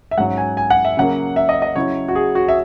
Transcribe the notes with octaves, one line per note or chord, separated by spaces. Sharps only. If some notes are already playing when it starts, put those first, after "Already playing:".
E5
G#2 F#3 C#4 F#5
G#5
G#5
F#5
E5
C#3 F#3 A#3 F#5
E5
D#5
D#5
C#3 F#3 C#4 E4 C#5
F#4
G#4
F#4
E5